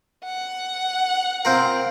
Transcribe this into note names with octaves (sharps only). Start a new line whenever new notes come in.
F#5
C4 F4 A#4